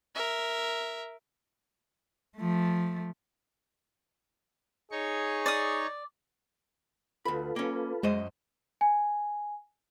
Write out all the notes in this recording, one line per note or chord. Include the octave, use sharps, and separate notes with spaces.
A#4 E5
F3 A3
D#4 G#4 C#5 C#6
D5 D#6
D2 F4 A4 B4 B5
A#3 C#4
F#2 G#3 C5 D#5
G#5